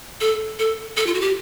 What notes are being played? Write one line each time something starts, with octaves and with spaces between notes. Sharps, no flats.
A4
A4
A4
F4
F#4
G4